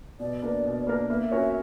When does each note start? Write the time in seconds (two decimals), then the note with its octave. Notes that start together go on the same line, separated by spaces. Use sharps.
0.20 B2 D5
0.42 A#3 D4 A#4
0.65 B2
0.87 A#3 D4 A#4
1.09 A#3 E5
1.31 C#4 F#4 A#4 C#5